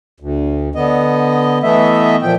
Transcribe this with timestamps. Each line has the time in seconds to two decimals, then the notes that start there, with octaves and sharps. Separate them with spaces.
0.20 D2
0.75 D3 B3 D#5
1.63 E3 A3 B3 D#5 E5
2.22 A#2 F3 G5